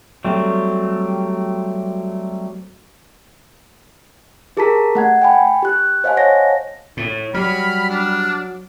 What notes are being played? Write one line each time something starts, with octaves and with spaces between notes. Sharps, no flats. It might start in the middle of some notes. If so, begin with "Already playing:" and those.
F#3 G3 A3 C4
G4 G#4 A#4 A5 A#5 B6
A3 F#5 G#6
G5 G#5 B5
G4 F#6
C5 D#5 F5 F#5 G#5 A5
C#5 G#5 A#6
A2
F#3 G3 B5 F6
D4